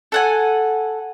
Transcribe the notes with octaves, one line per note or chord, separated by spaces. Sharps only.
A4 F#5 G#5